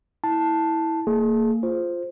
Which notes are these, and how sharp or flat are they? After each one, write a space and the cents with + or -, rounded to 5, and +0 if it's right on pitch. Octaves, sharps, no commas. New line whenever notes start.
E4 -20 A5 +0
A#3 -30 G#4 +20
F4 +0 C5 +0